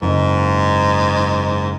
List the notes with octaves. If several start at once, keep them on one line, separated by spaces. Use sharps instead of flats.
F#1 G#2